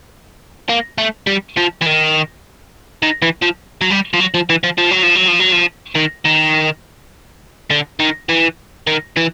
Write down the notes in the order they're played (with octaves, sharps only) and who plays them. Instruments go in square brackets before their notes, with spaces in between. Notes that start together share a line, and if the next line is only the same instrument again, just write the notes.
[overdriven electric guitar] A#3
A3
G3
F3
E3
D#3
D#3
E3
F3
F#3
G3
F3
F#3
F3
E3
F3
F3
F#3
F3
F#3
F3
F#3
F3
D#3
D#3
D3
D#3
E3
D#3
E3